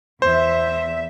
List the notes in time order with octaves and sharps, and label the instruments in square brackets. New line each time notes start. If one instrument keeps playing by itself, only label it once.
[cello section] E2 E5 [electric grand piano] C5